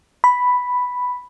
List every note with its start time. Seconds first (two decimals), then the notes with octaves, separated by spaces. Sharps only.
0.24 B5